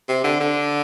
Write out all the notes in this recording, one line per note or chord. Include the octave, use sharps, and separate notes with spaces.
C3
D3
D3